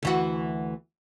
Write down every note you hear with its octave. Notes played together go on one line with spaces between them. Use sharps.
D2 E3 F#4